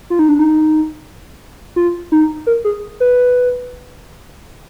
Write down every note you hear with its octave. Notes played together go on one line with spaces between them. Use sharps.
F4
D#4
D4
D#4
F4
D#4
A#4
G#4
B4